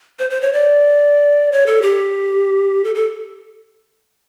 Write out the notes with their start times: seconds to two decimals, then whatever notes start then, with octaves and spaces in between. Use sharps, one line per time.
0.19 C5
0.30 C5
0.41 C#5
0.53 D5
1.52 C#5
1.66 A4
1.82 G4
2.84 A4
2.95 A4